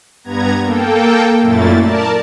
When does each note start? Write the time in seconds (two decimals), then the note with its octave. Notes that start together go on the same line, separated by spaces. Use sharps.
0.24 G2 B3 A#5 G#6
0.63 A#3 A4 G5
1.42 F#2 A#2 A3 A#3 E4 A6
1.80 A#4 D5 A5